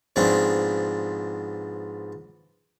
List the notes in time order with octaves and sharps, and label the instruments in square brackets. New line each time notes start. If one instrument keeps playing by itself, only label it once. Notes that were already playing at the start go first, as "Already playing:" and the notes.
[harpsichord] G#2 B2 F3 C4 D4